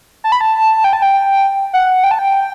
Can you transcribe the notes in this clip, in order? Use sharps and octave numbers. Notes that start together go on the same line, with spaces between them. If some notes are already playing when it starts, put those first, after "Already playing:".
A5
B5
A5
G5
A5
G5
F#5
G5
A5
G5